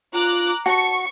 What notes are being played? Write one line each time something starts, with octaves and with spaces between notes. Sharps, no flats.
F4 A#5 D6 F#6
F#4 A5 C#6 C#7